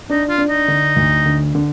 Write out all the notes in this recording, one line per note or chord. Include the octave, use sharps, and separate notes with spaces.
D4 D#4
F4
D4
D#4
D3
D2
D3
D3